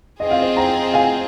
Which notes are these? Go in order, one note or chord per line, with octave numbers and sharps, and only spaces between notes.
C4 F4 G#4 D#5
F5
C5 D#5
G5 A#5
F5 G#5